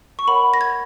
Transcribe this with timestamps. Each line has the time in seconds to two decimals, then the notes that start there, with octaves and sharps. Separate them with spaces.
0.19 C#6
0.27 A#4 C#5 F#5 B5
0.54 A#6
0.61 G#6